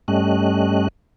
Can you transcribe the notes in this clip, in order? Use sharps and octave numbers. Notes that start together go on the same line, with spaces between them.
G2 G3 A3 C#4 D#5 F#6